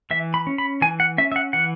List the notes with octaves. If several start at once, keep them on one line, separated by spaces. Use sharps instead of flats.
E3 E5
B5
C#4
B5
E3 G#5
F#5
C#4 E5
E5
F#5
E3 F#5